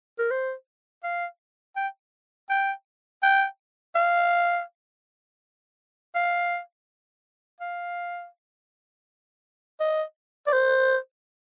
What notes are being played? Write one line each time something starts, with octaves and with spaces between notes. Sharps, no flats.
A#4
C5
F5
G5
G5
G5
F5
F5
F5
D#5
D5
C5